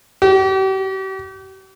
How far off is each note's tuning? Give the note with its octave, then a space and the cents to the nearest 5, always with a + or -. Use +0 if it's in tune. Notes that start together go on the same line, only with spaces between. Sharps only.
G4 -40